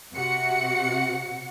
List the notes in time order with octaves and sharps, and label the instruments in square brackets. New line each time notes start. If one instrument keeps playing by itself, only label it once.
[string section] C3 F#4 F#5 C#7